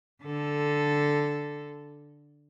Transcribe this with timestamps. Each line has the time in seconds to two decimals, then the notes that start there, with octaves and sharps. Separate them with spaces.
0.23 D3 A4